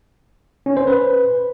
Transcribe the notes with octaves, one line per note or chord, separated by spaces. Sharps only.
C#4
C5
B4